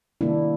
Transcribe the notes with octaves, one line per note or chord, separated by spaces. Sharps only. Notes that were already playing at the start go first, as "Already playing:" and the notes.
C3 D#3 G3 A#3 D4 E4